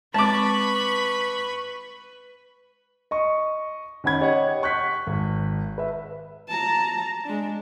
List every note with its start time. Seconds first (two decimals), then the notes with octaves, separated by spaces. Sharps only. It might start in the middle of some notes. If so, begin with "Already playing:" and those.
0.14 G#3 C4 B4 A5 B5 C#6 D6
3.11 D#5 C#6
4.04 D#3 C#4 F#5 B5 G#6
4.21 G4 C#5 D#5 F#5
4.63 C#6 F#6 G6 B6
5.07 G#1
5.78 B4 E5
6.49 A5 A#5
7.25 G#3 D4